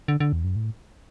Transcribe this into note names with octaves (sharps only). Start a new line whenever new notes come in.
D3
D3
E2
F#2
A2